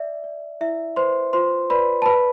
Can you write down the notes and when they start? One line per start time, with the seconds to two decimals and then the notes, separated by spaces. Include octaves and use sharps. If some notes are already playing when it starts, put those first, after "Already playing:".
Already playing: D5 E5
0.24 D5
0.61 E4 E5
0.96 B4 C5 C6
1.33 F4 C5 C6
1.70 B4 D5 B5
2.02 A5
2.06 B4 B5